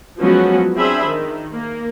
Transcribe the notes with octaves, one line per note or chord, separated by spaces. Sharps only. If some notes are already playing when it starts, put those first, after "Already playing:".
F3 F#3 G#3 B3 C#4 F#4
C4 D4 G#4 C5 E5 B5
D#3
A#3